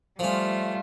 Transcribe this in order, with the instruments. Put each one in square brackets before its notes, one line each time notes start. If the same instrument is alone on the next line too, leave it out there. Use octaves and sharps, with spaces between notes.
[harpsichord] F3 C#4 [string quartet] G3 A3 F4